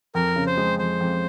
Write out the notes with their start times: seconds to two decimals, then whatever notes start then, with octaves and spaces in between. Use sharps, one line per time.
0.15 F2 A#4
0.36 C#3
0.47 C5
0.57 G#3
0.79 F2 C5
1.01 F2